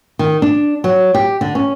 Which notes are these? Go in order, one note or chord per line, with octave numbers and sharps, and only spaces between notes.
D#3
D4
F#3
G4
D3
C#4